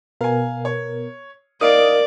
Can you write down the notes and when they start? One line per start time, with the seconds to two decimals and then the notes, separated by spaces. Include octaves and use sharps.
0.21 B2 B3 A#4 F5 G#5
0.65 C#5
1.61 D#4 A#4 D5 F5 D#6 D7